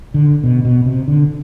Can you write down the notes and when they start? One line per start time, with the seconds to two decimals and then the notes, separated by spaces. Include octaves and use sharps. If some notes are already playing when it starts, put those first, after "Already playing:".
0.14 D3
0.44 B2
0.65 B2
0.86 C3
1.08 D3